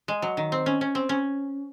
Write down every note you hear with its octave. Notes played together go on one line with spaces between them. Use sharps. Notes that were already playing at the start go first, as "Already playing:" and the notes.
G#3
F#3
D#3
C4
C#4
C#4
C4
C#4